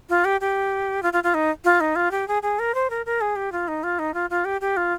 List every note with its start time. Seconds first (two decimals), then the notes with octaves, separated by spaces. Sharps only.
0.09 F4
0.25 G4
0.41 G4
1.03 F4
1.13 F4
1.23 F4
1.34 D#4
1.64 F4
1.80 D#4
1.96 F4
2.11 G4
2.28 G#4
2.42 G#4
2.59 A#4
2.74 C5
2.90 A#4
3.06 A#4
3.21 G#4
3.36 G4
3.52 F4
3.68 D#4
3.83 F4
3.99 D#4
4.14 F4
4.30 F4
4.45 G4
4.61 G4
4.77 F4